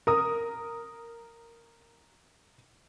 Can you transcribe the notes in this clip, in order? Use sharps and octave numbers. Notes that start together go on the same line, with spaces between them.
A#4 D#6